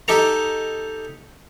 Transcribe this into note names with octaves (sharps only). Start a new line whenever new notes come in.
D#4 G4 A4 A#5